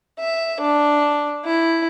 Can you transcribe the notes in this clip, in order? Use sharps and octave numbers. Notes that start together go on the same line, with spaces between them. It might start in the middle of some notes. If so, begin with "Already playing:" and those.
E5
D4
E4